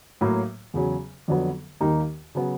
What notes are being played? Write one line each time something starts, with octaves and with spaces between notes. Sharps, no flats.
A2 F#3 A#3
E2 C#3 F#3
F2 D3 F#3 B3
D#2 D#3 G3 A#3 D#4
C#3 F#3 B3